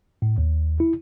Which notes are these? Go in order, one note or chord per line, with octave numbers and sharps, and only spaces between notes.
A2
D#2
E4